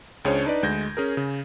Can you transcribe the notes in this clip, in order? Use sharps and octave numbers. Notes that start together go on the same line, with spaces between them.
C#2 C#4 D4 G#4 C5 C#5
D4 D#4 B4 D5
D2 G#3 G6 G#6 A#6
C#4 G#4 A#4
C#3